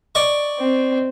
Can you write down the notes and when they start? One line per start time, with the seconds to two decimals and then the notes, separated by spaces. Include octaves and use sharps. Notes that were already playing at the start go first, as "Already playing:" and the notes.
0.15 D5 D#5 C#6
0.59 C4